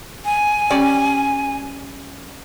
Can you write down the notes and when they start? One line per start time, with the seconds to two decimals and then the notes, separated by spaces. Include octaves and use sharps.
0.25 G#5
0.70 G3 C#4 D5